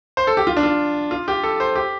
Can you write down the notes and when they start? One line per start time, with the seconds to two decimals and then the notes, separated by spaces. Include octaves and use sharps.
0.17 C5
0.27 A4
0.37 G4
0.47 F4
0.57 D4
0.63 F4
1.11 F4
1.28 G4
1.43 A4
1.60 C5
1.75 G4